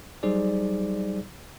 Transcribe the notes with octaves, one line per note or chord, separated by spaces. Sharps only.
F#3 G3 D#4 G#4 C5 D5